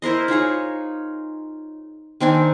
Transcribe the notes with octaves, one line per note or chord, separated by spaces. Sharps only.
E4 A#4 C5 D#5
D#4 F4 G#4 C#5
D#3 C4 D4 G#5